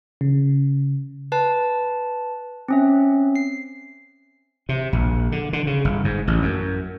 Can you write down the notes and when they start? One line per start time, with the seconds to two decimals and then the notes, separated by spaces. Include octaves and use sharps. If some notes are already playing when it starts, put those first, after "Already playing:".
0.21 C#3
1.32 B4 A5
2.68 C4 C#4 E5
3.36 C7
4.69 C3
4.93 A#1
5.32 D3
5.53 D3
5.67 C#3
5.85 G1
6.05 G#2
6.27 A1
6.42 F#2